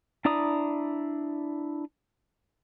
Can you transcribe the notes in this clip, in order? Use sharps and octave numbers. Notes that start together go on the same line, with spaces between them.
D4 E4 D5 A#5 D#6